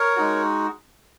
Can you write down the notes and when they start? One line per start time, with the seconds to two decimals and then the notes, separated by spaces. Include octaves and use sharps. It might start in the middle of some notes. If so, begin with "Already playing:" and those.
Already playing: A#4 C#5
0.16 G#3 D#4 F#4